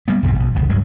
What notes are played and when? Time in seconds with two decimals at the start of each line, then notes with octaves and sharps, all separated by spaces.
0.08 G3 A#3 B3
0.23 C2 F2 G#2 C3
0.36 A#1 B2
0.55 D#1 C2 C#3 F3
0.69 D2 G2 F#3 G#3